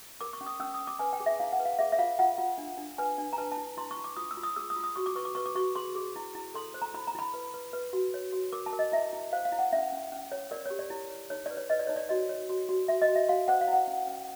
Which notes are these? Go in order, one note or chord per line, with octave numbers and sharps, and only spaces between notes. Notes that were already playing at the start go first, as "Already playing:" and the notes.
A#4 D6
C#6
C#4
D#6
C#4 E6
D#6
C#4
D6
B4 G#5
G5
G#4
E5
E4 F5
F#5
B4
F5
G#4 E5
E5
F4 F5
F4 F#5
F4
D4
D4
B4 G#5
D4
A#5
B4 A5
A5
E4
E4 C6
C#6
E4
D6
F4 D#6
E6
F4
D#6
G#4 E6
D#6
F4
D#6
F#4 C#6
D6
B4 C#6
D6
B4 C#6
D6
F#4 C#6
G#4 C6
G#4
E4
E4
A4 C6
C5
A#5
E4 B5
A#5
E4 B5
B4
B4
B4
F#4
C#5
F#4
A#4 D6
A5
A#4
D#5
E4 E5
E4
C5 F5
F5
E4
F#5
C#4 E5
C#4
C#4
C#5
A#4 D5
G4 C#5
D5
E4
C#5
D#4 C#5
B4 D5
C#5
B4 D#5
D5
D#4 C#5
D5
F#4 D#5
C#5
F#4
F#4
F#4 E5
D#5
F#4
E5
F#4 F5
C5 F#5
F5
E4
F#5
C#4
C#4